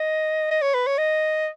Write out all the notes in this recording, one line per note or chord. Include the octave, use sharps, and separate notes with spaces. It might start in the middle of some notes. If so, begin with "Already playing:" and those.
Already playing: D#5
D#5
C#5
B4
C#5
D#5